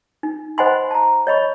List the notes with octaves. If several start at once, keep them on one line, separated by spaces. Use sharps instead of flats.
D#4
C5 D#5 F#5 G#5 B5 C6
A5 A#5
C#5 D#5 B5 C#6